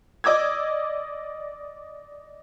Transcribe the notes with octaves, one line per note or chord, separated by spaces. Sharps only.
D5 D#5 D6 E6 G#6